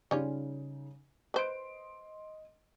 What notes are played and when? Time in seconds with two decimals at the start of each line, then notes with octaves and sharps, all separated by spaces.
0.11 C#3 G3 C#4 D#4 F4
1.34 B4 C5 D#5 C6 D7